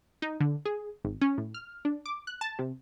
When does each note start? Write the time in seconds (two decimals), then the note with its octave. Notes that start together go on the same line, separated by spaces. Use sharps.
0.22 D#4
0.40 D3
0.65 G#4
1.05 G#1
1.21 C#4
1.38 A2
1.54 F6
1.85 D4
2.06 D6
2.27 F#6
2.41 A5
2.59 C3